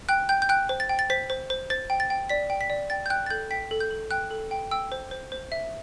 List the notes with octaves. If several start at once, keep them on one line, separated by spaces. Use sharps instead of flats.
G5 F#6
G5 G6
G6
G5 F#6
C5
A6
G5
A6
C5 B6
C5
C5
C5 A6
G5
A6
G5
D5 B6
G5
B6
D5
G5 A6
G6
G5 F#6
A6
A4 G6
G5 B6
A4
G6
A4
G5 F#6
A4
G5
G5 E6
C5
C5
C5
E5